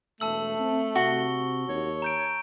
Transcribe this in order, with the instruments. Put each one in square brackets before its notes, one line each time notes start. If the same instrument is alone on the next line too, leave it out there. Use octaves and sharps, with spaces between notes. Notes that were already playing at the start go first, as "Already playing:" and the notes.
[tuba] E1 [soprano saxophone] A3 [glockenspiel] A5 E6 F#7
[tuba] C4
[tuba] C3 [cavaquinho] F#4 [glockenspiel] C#6 G7
[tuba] D#2 [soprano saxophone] C#5
[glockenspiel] A#5 G6 D7